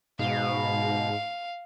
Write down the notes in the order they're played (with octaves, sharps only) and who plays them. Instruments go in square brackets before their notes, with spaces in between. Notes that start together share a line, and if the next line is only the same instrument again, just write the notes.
[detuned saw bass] G#2 [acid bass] B2 [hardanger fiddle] F5